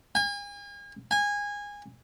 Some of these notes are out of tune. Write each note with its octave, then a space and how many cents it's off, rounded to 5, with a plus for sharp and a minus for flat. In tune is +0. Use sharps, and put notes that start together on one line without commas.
G#5 -40
G#5 -20